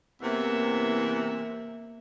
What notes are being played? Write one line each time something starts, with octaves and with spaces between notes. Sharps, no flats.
E2 C3 E3 A#3 E5